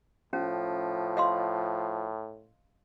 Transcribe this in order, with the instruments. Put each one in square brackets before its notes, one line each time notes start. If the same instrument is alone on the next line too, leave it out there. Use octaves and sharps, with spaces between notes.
[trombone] A2 [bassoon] F3 [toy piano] C#4
[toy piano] D#5 F5 C6